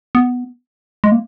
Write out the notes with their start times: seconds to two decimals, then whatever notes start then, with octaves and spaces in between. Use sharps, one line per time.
0.15 B3
1.04 G#3
1.12 A#3